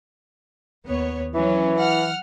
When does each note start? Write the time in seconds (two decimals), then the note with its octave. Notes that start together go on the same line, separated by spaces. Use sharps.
0.85 D#2 B3 C#5
1.34 E3 F#3 C#4
1.77 F#5 F6